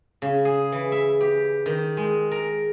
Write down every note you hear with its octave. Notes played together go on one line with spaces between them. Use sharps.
C#3
G#4
E3
E5
G4
D#3
G#3
A#4